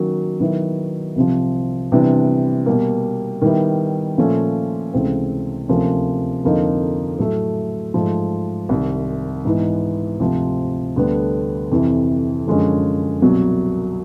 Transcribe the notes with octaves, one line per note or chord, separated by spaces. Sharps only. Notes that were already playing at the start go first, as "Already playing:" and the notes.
Already playing: D#3 F#3 A#3 C#4 F#4
D#3 F#3 B3 E4
C2 C3 F3
C3 E3 G3 B3 D4
B2 G3 A#3
D#3 G3 B3 E4
A#2 F3 A3 C#4
C#2 C3 E3 A3 C4
D2 C3 F3 A#3 C#4
F2 D3 F3 A#3 D#4
A2 F#3 A3
G#2 F3 A3
C2 C3 D#3
G#2 E3 G#3 B3 D#4
D2 C3 F3
D2 D3 G3 B3 D4
F2 C3 E3
F#2 D3 F3 G#3 C#4
C2 B2 F#3